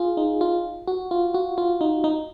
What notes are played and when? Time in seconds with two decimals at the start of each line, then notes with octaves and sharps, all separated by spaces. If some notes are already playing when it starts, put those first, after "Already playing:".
Already playing: F4 G#4
0.17 D#4
0.41 F4
0.88 F#4
1.11 F4
1.34 F#4
1.58 F4
1.81 D#4
2.04 D#4